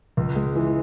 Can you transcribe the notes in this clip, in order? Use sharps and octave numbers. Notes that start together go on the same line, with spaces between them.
C#2
G#3
E3